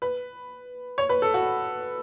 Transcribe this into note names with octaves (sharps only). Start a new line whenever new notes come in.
B4
C#5
B4
A4
F#4